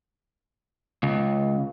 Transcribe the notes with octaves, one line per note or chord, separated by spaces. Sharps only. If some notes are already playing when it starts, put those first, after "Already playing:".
C#2